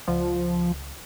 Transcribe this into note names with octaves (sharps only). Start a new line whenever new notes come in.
C#2 F3